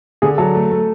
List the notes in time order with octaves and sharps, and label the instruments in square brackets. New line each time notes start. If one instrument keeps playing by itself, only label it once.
[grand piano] D3 [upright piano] G#4
[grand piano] F#3 [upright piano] A4
[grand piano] A3
A3